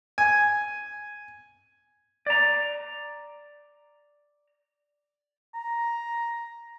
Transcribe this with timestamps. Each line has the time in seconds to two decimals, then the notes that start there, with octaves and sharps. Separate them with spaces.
0.18 G#5
2.26 D5 A#5
5.54 A#5